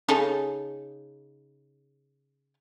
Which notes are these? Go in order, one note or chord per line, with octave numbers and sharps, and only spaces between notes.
C#3 D#4 A4